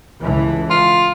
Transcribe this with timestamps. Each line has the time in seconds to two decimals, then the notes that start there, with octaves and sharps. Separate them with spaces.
0.21 C#2 A2 E3
0.71 F4